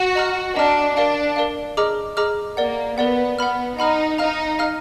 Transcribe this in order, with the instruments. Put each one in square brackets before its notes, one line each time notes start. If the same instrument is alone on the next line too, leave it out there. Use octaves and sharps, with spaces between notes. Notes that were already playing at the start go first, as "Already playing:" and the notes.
Already playing: [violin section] F#4
[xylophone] D#5 A#5 F6
[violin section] D4 [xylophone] D#5 A#5 F6
[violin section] D4 [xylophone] A#4 D5 F5
[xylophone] A#4 D5 F5
G#4 D#5 A#5 D6 F6
G#4 D#5 A#5 D6 F6
[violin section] A#3 [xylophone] A#4 D5 F#5
[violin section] B3 [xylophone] A#4 D5 F#5
[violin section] B3 [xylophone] F#5 B5 F6
[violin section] D#4 [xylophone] F#5 B5 F6
[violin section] D#4 [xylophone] F5 A#5 F6
[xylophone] F5 A#5 F6